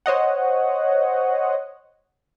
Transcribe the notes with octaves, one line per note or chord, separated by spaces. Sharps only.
C5 C#5 D#5 F#5